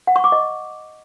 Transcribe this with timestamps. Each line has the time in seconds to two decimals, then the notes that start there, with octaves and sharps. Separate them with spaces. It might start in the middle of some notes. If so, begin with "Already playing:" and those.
0.07 F#5
0.16 C#6
0.24 D6
0.32 D#5